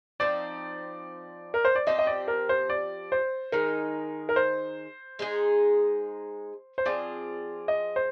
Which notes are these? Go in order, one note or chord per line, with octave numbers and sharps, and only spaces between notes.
F3 C4 D#4 D5
A#4
C5
D5
F3 C4 G4 D#5
D#5
D5
A#4
C5
D5
C5
D#3 G#3 D#4 A#4
A#4
C5
G#3 D#4 G#4
C5
F3 C4 F4 G#4 D5
D#5
C5